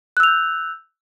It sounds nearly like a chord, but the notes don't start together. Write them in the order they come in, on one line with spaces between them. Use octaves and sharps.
F#6 E6 F7 G6